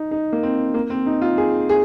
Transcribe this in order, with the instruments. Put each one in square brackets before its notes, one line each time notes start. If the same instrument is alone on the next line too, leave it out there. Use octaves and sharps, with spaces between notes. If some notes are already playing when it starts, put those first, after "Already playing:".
Already playing: [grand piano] D#4
D#4
A#3
C4
A#3
C4
D#4
F4
G#4
G#4